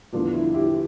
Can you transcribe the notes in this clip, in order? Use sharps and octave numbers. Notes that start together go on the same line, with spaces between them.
E2 D3 F3 D4 F4
E4
E4 G4